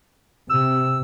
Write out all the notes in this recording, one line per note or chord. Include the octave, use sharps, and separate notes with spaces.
C3 E6